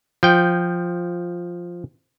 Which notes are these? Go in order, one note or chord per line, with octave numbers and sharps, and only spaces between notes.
F3 G5